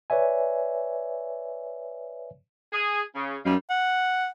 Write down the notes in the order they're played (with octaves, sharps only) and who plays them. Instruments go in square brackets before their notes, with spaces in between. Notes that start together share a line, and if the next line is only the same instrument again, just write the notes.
[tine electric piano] B4 C#5 D5 E5 G#5
[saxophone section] G#4
C#3
[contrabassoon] F#2 [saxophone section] G3 A#3 D#4
[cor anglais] F#5